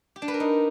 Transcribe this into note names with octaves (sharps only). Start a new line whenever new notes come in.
G4
D4
B4
A#4
D#4